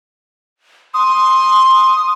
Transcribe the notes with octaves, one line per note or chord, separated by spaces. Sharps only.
C6 D#6